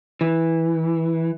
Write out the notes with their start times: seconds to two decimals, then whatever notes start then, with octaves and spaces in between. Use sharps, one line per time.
0.21 E3